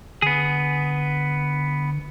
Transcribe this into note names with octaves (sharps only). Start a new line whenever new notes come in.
D3 B3 G#4